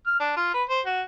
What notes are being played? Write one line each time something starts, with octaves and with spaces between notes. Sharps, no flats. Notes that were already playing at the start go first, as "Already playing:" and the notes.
F6
D4
F4
B4
C5
F#4